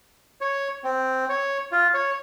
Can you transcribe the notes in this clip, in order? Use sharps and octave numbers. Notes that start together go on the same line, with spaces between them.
C#5
C4
C#5
F4
C#5